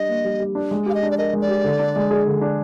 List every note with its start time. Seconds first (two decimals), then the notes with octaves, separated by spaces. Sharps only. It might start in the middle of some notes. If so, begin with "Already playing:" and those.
Already playing: G3 D4 D#5
0.09 A#3
0.24 G3
0.40 G3
0.55 D4
0.71 G#3
0.86 G4 F5
0.95 D#5
1.03 D4
1.11 D5
1.18 A#4 D#5
1.33 G#3
1.41 D5
1.49 G4
1.64 D3
1.79 D4
1.96 G#3
2.11 G#4
2.26 D3
2.41 D4